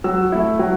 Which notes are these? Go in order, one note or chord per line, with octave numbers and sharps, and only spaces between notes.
F#3 E6
A3 E4
F#3